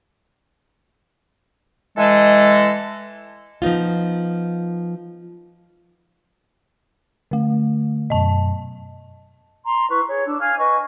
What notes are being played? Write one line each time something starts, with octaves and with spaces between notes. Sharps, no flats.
E3 G#3 A4
F3 B3 D#4 F4
D3 A3
F#2 B2 D#5 A5
A#5 C6
E4 B4 C#6
G#4 C#5
D4 E6
F5 G#5 F6 G#6
B4 D#5 G#5 C#6